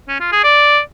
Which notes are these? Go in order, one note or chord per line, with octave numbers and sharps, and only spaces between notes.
C#4
F4
G#4
D5